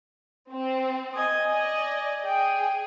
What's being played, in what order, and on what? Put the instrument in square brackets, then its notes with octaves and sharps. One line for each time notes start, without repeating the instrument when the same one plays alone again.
[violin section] C4
[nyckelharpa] D#5 G#5
[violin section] D5 D#5 [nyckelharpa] G#5
[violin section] G#4 [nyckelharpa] G5